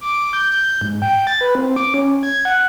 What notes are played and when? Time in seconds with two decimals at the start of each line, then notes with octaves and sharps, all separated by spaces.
0.01 D6
0.33 G6
0.51 G6
0.81 G#2
1.02 G5
1.27 A6
1.41 B4
1.55 C4
1.76 D6
1.94 C#4
2.23 G#6
2.45 F#5